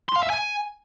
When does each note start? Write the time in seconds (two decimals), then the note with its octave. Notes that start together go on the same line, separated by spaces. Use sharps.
0.09 C6
0.16 F5
0.23 E5
0.30 G#5